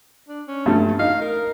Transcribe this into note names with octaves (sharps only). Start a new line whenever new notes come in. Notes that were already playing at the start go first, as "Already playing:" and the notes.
D4
C#4
G2 A3
D#4 F5
A#4